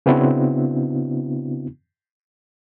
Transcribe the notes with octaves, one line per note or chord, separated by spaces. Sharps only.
C#3 B3 C4 D4 E4 F#4